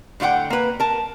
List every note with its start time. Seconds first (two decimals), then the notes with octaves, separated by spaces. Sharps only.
0.20 A2 D3 F4 F#5 G5
0.50 A#3 B4
0.80 A#4 A5